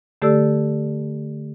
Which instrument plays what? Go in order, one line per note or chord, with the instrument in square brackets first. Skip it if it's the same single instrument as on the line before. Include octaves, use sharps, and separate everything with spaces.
[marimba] D3 A3 G4 A4 D5 E6